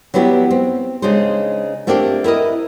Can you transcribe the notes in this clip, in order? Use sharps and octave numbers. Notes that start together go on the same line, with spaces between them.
F#3 G3 B3 E4 F4 G4
C4
C#3 G#3 D4 D#4 C5
A3 A#3 C4 D4 F4 G4
E4 A#4 B4 D#5